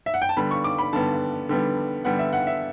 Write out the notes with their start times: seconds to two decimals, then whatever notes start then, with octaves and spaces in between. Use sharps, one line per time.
0.06 E5
0.14 F#5
0.22 G5
0.29 A5
0.37 D3 G3 B3 B5
0.51 C#6
0.64 D6
0.78 B5
0.93 D3 G3 B3 A5
1.49 D3 G3 B3
2.05 D3 G3 B3 F#5
2.19 E5
2.33 F#5
2.47 E5